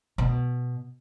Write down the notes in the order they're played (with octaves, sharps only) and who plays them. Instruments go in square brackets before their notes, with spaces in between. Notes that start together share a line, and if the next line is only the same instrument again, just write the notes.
[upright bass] B2